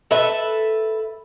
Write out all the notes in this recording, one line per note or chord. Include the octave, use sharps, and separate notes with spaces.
A4 B4 E5